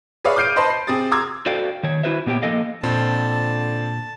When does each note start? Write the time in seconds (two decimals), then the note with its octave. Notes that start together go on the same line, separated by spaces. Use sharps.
0.25 G#4 B4 C#5 D5 E5 F5
0.36 D6 F6 G6 C7 D7 D#7
0.56 B4 C5 D#5 A5 B5 C6
0.70 C7
0.87 C3 C4 G#4 D#6 A6
1.11 A#5 C6 D6 E6 G#6
1.46 F#4 A4 C5 D5 F5 G5
1.83 D#3 C#5
2.03 E4 F#4 B4 C5 E5
2.26 A#2 B3 G4 C#5 G5
2.42 F3 G#3 A#3 A4 D#5 F5
2.83 F2 A#2 D3 C4 A5